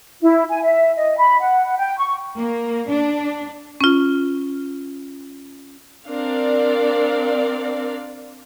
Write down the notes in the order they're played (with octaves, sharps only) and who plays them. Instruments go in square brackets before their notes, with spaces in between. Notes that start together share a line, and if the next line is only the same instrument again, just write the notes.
[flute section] E4
G#5
E5
D#5
B5
F#5
G5
C#6
[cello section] A#3
D4
[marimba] C#4 F4
[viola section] C4 D4 A#4 D5 F5